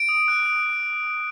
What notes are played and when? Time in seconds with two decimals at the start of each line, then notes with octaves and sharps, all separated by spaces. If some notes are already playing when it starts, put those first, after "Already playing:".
Already playing: D7
0.09 D#6
0.28 F#6
0.46 D#6